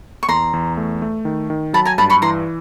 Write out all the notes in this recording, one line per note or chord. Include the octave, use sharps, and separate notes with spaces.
C#6
E2 A#5 C6
E2
A3
A3
D#3
D#3
F#3 A5 B5
G#5 A#5
G2 A5 B5
B5 C#6
E3 A#5 C6